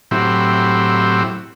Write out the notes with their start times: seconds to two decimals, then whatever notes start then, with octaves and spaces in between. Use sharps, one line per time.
0.11 A2 F#3 C4 E4 G4